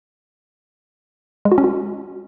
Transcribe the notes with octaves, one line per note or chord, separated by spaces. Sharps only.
G#3
F#4
C#4
F#4